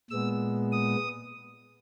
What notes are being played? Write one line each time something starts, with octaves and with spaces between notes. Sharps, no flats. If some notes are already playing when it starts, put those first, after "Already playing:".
A#2 G#3 B3 E6
D#6